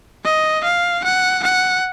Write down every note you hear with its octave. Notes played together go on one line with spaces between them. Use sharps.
D#5
F5
F#5
F#5